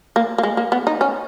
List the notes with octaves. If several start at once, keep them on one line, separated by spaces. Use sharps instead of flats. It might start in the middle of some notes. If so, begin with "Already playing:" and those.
A#3
A#3
G#3
A#3
B3
D#4
C#4